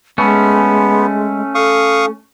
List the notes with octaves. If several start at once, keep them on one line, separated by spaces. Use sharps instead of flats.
G#3 A3 B3 C#4
A4 F5 C#6 D#6